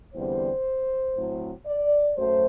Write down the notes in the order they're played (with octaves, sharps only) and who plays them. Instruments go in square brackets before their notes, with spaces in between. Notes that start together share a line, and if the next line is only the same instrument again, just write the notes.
[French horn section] E2 D3 G3 C4 C5
A2 F#3 C4
D5
F#2 F#3 A3 C5